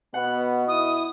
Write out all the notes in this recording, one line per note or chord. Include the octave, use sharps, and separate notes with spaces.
B2 B3 F#5
E4 D#6